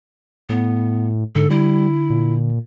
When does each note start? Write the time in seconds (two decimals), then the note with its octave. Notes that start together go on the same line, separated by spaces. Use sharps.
0.49 A2 B3
1.35 G#2 D3 A4
1.50 G3 E4
2.10 A#2